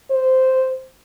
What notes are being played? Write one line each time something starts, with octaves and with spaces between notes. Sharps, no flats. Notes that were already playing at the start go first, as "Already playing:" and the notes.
C5